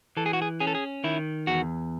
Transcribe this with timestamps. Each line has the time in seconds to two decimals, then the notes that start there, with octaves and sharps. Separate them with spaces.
0.17 E3 A4
0.26 G#4
0.33 F#4
0.42 G#4
0.60 C#4 G#4
0.67 A4
0.75 G#4
1.04 D#3 E4
1.47 E2 F#4